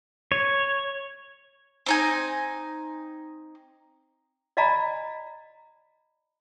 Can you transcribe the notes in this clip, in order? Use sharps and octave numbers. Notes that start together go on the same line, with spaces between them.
C#5
C4 D#4 G#5
D5 D#5 F5 G#5 A#5 B5